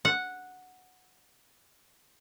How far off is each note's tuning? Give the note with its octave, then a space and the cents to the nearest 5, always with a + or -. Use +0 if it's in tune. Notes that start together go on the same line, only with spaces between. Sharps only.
F#5 -5